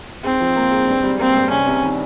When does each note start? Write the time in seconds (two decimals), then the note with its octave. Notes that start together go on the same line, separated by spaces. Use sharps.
0.24 G#2 C4
0.41 F3
0.56 A#3
0.72 G#2
0.88 G2
1.04 G3
1.19 A#3 C4
1.35 G2
1.51 C2 C#4
1.67 C3
1.82 D#3